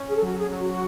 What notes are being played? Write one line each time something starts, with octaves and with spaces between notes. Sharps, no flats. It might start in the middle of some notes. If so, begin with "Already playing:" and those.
Already playing: C#4
G#4
A4
F#3 F#4
G#4
F#3
F#4